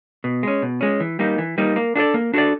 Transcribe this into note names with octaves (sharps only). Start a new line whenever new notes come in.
B2
G#3 C#4
B2
G#3 C#4
E3
G3 A#3 D#4
E3
G3 A#3 D#4
A#3
D4 F#4 A4 D5
A#3
D4 F#4 A4 D5